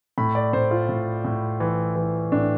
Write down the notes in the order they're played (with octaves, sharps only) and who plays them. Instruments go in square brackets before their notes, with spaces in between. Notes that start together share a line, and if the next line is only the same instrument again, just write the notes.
[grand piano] A2 B5
D5
A2 C5
F4
A2
A2
E3
E3
A2 D4